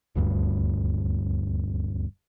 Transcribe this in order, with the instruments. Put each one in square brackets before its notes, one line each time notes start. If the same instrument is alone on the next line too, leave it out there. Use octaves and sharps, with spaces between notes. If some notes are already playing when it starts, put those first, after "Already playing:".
[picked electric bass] D#1 D2 G2